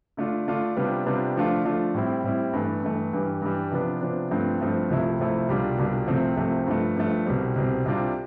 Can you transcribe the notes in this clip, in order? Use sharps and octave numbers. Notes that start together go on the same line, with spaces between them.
D3 A3 D4 F4
D3 A3 D4 F4
C3 G3 B3 D4 F4
C3 G3 B3 D4 F4
D3 F3 A3 D4 F4
D3 F3 A3 D4 F4
A2 G3 C4 E4
A2 G3 C4 E4
G2 E3 A3
G2 E3 A3
G2 E3 G3
G2 E3 G3
C3 F3 B3 D4
C3 F3 B3 D4
G2 F3 A3 C4
G2 F3 A3 C4
C2 C3 F3 A3 E4
C2 C3 F3 A3 E4
C2 B2 G3 D4 F4
C2 B2 G3 D4 F4
C2 C3 F3 A3 C4
C2 C3 F3 A3 C4
G2 F3 A3
G2 F3 A3
C2 B2 G3 C4
C2 B2 G3 C4
C2 C3 G3 D4 F4